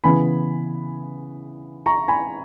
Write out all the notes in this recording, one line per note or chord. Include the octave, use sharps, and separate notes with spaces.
C#3 E3 B3 G#5 B5
A#5 C#6
G#5 B5